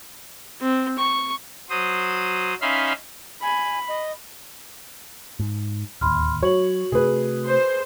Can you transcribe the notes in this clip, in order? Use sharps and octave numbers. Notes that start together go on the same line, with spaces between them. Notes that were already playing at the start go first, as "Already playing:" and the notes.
C4
C#6
F#3 C5 D#6
C#4 D#4 E5 F5 B5 C6
G#5 B5
D#5
G#2
D1 D#2 B5 C6 F6
F#3 F#4 C#5 F#7
C3 A3 G#4 B4
C5